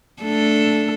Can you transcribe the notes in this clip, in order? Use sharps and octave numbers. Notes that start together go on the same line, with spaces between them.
A3 D4 A4